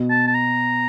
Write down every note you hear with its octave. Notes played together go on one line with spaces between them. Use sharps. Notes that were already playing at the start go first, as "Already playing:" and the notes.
Already playing: B2
A5
A5
A#5